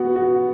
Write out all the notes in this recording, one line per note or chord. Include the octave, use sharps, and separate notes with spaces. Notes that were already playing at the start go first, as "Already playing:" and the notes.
Already playing: B3 F#4
F#4